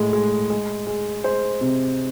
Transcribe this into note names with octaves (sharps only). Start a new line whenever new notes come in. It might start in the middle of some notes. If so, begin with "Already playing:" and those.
Already playing: A2 G#3
G#3
G#3
G#3
G#3 C5
C3